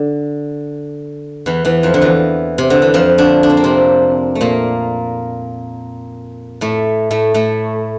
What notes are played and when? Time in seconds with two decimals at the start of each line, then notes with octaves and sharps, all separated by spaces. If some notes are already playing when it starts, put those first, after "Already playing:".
Already playing: D3
1.46 E2 E3
1.65 E2 E3
1.83 F2 F3
1.94 D3
2.02 E2 E3
2.58 C3
2.70 D3
2.82 E3
2.94 F2 F3
3.18 D3 D4
3.43 D4
3.50 C4
3.57 A#3
3.64 C3 C4
4.35 A3
4.41 A#2 A#3
6.61 A2 A3
7.11 A2 A3
7.34 A2 A3